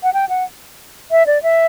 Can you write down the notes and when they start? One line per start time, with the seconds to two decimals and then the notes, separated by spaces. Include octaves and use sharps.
0.03 F#5
0.14 G5
0.29 F#5
1.11 E5
1.27 D5
1.43 E5